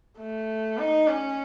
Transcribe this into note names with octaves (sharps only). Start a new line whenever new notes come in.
A3
D#4
C#4